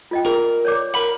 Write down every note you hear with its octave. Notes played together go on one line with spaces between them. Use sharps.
F4 D#5 G5
G#4 A#4
C#5 D5 D6
A#4 B5